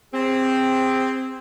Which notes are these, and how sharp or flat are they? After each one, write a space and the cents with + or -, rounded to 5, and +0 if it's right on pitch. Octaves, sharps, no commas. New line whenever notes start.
C4 +0 G#4 -30